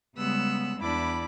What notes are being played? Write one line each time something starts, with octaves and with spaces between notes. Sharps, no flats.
C#3 G3 G#3 B3 E6 F#6
E2 D4 E4 B5 D6